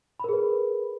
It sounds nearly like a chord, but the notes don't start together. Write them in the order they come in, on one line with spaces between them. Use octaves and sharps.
B5 A#4 G#4 B4